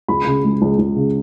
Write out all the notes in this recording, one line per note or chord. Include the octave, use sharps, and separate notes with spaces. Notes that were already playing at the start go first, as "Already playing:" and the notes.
C#2 B5
C#3
G#3
C#2
C#2
C#3